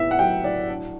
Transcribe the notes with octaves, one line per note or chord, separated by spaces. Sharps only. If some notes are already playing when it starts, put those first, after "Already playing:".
Already playing: A2 B3 E5
F#5
F#3 G5
A2 D5
D4